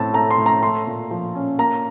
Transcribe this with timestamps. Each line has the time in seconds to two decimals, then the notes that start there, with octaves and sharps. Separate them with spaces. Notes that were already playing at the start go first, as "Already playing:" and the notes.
Already playing: A2 C4 A5
0.13 A3 A#5
0.31 C6
0.38 A2
0.46 A#5
0.62 A3 C6
0.87 A#2
1.11 F3
1.35 C#4
1.58 A#3 A#5